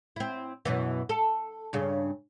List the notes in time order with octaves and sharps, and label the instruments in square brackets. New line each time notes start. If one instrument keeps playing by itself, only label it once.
[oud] C4 E4
F#2 B2 E3
A4
G2 C#3